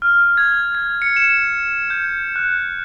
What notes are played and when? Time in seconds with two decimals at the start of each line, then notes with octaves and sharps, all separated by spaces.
0.02 F6
0.37 G#6
0.75 G#6
1.02 C#7
1.16 E7
1.90 G6
2.36 F#6